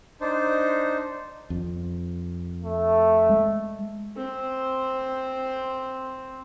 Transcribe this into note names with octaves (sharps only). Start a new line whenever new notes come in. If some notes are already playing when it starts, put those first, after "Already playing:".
D4 D#4 C5
F2
A3
G#3
C4 C5